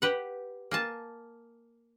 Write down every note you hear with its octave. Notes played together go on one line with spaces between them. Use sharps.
G4 B4 F#5
A#3 G#5 A5